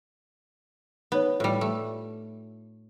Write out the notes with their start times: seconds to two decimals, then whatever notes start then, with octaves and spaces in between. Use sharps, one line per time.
1.12 B3 D#4 C#5
1.40 A2 G3 F4
1.61 A3